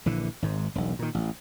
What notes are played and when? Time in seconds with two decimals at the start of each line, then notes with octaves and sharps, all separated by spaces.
0.06 A#1 D3 E3
0.42 G#1 G#2
0.75 E1 B1
0.99 A#2 D#3
1.14 A1